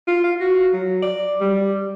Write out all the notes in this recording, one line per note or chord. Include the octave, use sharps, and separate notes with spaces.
F4
F5
F#4
F#3
D5
G3